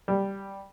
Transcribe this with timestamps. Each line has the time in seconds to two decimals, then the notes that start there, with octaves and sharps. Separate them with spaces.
0.08 G3